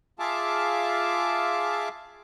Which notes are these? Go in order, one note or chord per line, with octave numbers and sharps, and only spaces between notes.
F4 G#4 E5 F5 A5 D6